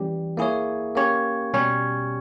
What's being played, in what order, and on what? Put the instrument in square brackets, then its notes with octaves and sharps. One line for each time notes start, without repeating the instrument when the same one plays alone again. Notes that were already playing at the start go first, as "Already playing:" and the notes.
Already playing: [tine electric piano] E3 G3 C#4 G4
A#3 E4 G#4 C#5
A#3 C#4 G4 C#5
B2 G3 C#4 G4 C#5